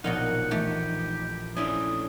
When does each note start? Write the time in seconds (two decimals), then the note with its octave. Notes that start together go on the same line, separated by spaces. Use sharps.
0.04 A#1 B2 F#3 D#4 F5 F#5
0.51 E3 A3 G4
1.56 A3 C#4 D4 E4 C5 C#5 G#5 D#6